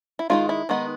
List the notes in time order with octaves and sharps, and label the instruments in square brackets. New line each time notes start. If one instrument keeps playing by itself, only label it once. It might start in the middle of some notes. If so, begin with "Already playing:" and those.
[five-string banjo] E4
D#3 G#3 B3 D#4 F4
E4
D#3 G#3 B3 D#4